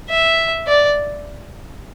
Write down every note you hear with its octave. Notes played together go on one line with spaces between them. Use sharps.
E5
D5